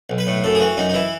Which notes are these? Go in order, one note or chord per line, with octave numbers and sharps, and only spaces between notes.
B1
B4
A2
F#2 A4
G#4
E3 F#4
F#2 D#4
D#4
E3 E4